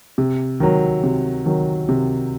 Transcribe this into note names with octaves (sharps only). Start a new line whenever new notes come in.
C3
D#3 F#3
C3
D#3 F#3
C3